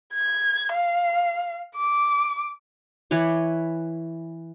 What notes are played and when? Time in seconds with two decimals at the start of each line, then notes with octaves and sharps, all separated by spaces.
0.14 G#6
0.72 F5
1.77 D6
3.11 E3 B4 C#5 D6